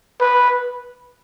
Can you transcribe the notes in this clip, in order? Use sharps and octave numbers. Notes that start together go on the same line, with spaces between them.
B4